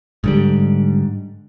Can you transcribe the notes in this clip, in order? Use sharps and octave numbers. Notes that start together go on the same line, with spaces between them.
G#2 D3 G3